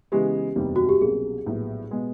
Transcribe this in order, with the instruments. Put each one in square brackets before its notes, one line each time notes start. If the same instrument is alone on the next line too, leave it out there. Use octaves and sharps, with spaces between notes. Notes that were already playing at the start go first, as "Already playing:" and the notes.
[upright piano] C#3 E3 G#3 B3 [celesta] G4
[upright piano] F#1 E2 C3 D#3 G3
[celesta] F#4
G4
[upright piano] C2 B2 F#3 A#3 C#4 [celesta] G#4
[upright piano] A#1 A2 F#3 B3
B2 G#3 B3